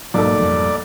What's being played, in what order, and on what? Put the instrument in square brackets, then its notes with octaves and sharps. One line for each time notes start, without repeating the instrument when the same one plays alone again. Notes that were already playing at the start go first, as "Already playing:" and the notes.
[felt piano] B1 A#3 A4 [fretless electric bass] G#2 F#3 [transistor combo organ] D5
[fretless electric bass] F2 F3 G3